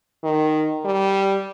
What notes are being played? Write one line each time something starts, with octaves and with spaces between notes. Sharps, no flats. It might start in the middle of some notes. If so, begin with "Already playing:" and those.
D#3
G3